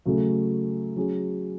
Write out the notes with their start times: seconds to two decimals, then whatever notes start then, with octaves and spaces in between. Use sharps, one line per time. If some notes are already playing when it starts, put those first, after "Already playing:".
0.05 C#3 F#3 A3
0.96 F#3 C#4 G#4